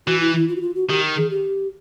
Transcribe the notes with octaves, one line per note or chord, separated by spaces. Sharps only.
E3 F#4
E4
E4
F4
F#4
F4
F#4
D#3 G4
G#4
G4